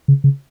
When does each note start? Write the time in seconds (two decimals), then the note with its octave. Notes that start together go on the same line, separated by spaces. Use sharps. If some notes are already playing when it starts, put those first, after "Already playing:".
0.08 C#3
0.24 C#3